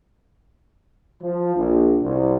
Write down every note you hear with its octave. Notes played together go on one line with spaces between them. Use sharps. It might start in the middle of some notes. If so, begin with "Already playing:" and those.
F3
A#1
C2